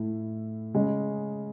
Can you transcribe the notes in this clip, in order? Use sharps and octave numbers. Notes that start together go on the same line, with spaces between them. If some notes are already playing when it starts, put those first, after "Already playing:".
Already playing: A2 A3 E4
C#3 G#3 C#4